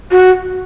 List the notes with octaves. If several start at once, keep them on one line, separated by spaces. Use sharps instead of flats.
F#4